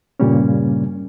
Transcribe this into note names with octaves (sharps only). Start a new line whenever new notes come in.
G2 A#2 C#3 G3 A#3 C#4